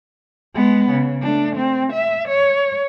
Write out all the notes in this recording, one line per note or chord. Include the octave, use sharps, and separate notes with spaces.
G#3 B3
C#3
A3 D4
C4
E5
C#5